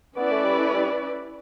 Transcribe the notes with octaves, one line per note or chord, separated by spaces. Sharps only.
B3 C#4 E4 B4 D5
A3
G3
A3
G3